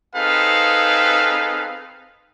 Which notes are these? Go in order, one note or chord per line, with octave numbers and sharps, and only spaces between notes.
C4 D#4 G#4 A4 B4 F5